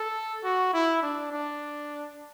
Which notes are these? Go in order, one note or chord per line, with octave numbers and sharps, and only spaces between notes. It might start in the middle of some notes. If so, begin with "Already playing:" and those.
Already playing: A4
F#4
E4
D4
D4